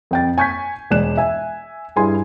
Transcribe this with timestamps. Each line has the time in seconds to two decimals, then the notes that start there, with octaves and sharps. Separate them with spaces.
0.11 F2 G5 A6
0.38 G#5 C#6 G6 G#6 B6
0.91 E1 G#3 D5 F#6 E7
1.17 E5 G#5
1.96 G2 E4 G#4 G#5 C6